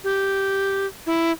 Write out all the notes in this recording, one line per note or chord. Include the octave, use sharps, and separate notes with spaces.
G4
E4